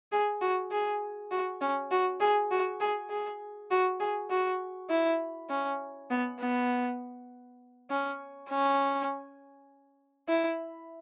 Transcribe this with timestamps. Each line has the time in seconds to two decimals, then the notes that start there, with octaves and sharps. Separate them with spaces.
0.12 G#4
0.41 F#4
0.71 G#4
1.31 F#4
1.61 C#4
1.91 F#4
2.20 G#4
2.51 F#4
2.80 G#4
3.10 G#4
3.71 F#4
4.00 G#4
4.30 F#4
4.90 E4
5.50 C#4
6.10 B3
6.40 B3
7.90 C#4
8.50 C#4
10.28 E4